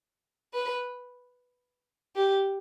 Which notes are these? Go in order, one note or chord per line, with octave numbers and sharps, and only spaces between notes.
B4
G4